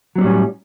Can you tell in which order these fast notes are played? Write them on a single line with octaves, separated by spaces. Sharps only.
F#3 C4 G3 A2 C#4